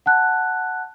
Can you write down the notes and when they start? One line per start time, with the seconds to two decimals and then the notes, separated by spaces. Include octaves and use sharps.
0.06 F#5 A5 F#6